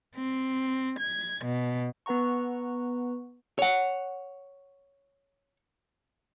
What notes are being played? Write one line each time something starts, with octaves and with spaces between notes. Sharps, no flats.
C4
G#6
B2
B3 B4 F#5 A#5 C#6
C#5 F#5